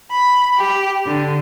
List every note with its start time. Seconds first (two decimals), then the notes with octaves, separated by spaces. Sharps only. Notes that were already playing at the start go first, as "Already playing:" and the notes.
0.11 B5
0.58 G4
1.06 D3